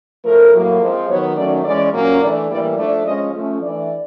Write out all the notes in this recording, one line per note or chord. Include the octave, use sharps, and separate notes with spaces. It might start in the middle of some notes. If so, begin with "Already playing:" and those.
A2 F3 A3 A#4
A2 F#3 A#3
F3 G#3 C4
D#3 F#3 B3 C#5
D#3 F#3 A3 C#4 D5
E3 G#3 C#4 D5
A#2 F#3 A#3 C#4
E3 A3 D4 D5
A2 E3 G3 A#3 D5
F3 A3 D4 D5
F3 G#3 C#4 D#5
F3 A3 C#4
E3 A3 D4 D5